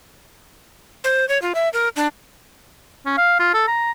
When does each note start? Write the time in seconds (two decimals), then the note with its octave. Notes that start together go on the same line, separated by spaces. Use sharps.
1.04 C5
1.29 C#5
1.42 F4
1.55 E5
1.73 A#4
1.96 D4
3.06 C#4
3.17 F5
3.39 F4
3.54 A4
3.67 A#5